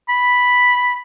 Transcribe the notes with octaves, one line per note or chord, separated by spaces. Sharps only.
B5